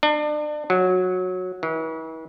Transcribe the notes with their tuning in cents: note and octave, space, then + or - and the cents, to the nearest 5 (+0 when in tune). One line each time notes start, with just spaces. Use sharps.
D4 +35
F#3 -15
E3 -40